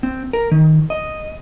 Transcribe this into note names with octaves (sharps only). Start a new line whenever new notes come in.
C4
A#4
D#3
D#5